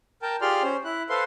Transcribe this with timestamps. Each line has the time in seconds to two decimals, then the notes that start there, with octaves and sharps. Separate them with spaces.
0.22 A#4 G5 A5
0.41 F4 G4 G#4 D5 C6 F6
0.63 C#4 C5
0.85 E4 F#6
1.10 A4 B4 C5 F5 C6